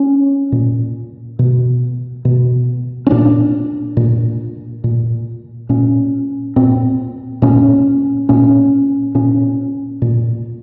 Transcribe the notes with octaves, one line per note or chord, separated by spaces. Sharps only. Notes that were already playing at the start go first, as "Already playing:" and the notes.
Already playing: C#4
A#2
B2
B2
C#4
A#2 D4
A#2
A#2
A#2 C#4
A#2 C4
A#2 C#4
A#2 C#4
A#2 C#4
A#2